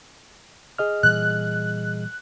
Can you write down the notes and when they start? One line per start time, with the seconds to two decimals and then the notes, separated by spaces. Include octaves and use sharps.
0.78 G#4 D#5 F6
1.03 A#2 E3 G3 F#6